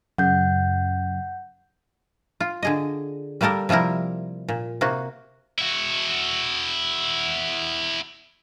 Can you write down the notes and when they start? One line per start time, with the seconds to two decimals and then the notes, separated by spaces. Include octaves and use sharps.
0.18 F#2 C#3 F#5 G6
2.40 F4
2.63 D3 G#4 D#5
3.41 G3 A#3 G4 A4 A#4
3.69 C3 F3 G3 E4 A#4
4.48 A#2
4.81 C3 A#3 F#4
5.58 E4 F#4